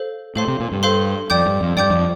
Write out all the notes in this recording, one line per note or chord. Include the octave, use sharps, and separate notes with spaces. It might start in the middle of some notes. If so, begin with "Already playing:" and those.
Already playing: A4 C5 F5
A2 A4 C5 F5 C6
C3
A#2
G2
A4 C5 F5 C6
F2 D5 G5 D6 G6
G2
F2
G2 D5 G5 D6 G6
F2